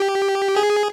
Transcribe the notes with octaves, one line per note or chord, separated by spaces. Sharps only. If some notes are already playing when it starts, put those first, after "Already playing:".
Already playing: G4
G#4